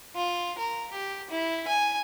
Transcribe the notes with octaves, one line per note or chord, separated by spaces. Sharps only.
F4
A#4
G4
E4
G#5